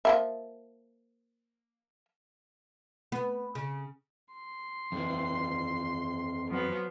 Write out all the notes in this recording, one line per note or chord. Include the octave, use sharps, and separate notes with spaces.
F3 A#3 E5
B3
C#3
C6
F2 E3
F3 F#3 B3